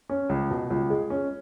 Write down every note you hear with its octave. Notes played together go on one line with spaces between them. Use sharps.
C#4
C#2
B2
C#2
G#3
C#4